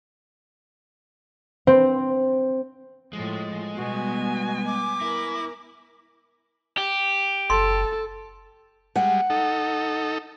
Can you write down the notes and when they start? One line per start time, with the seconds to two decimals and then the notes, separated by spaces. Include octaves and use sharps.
1.67 C4
3.13 A2 F3 G#3
3.77 B2 G3 B3 F#4 G#5
4.66 D6
5.01 E4 A#4
6.78 G4
7.50 F#1 A4 C6
8.96 G3 G#3 F#5
9.30 D#4 A4